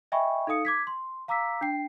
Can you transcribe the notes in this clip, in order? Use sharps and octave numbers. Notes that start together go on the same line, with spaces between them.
D#5 E5 G5 G#5 B5 C#6
D#4 A4 F5 D#6 C#7
D6 G#6 B6
C6
F5 A#5 D6 E6 B6
D4 G5 C7